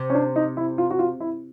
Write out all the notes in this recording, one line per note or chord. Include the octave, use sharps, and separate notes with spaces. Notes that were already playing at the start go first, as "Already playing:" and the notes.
Already playing: C3
C#4
D4
D#4
E4
F4
F#4
F4
E4